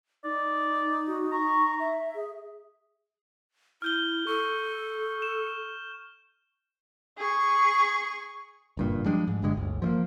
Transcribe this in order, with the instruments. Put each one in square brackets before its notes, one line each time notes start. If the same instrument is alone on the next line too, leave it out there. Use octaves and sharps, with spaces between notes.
[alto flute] D#4 [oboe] D5
[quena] F#4
[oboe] A#5 [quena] C#6
[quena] E5
[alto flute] G#4
[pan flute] E4 [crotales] F6 G6 G7
[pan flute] A4 [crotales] C#6
[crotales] E7
[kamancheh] G#4 C#6
[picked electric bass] F#1 G2 A#2
F3 G3 G#3 D4
G#2
G1 G2 D3 G#3
G1 D2
F3 A3 A#3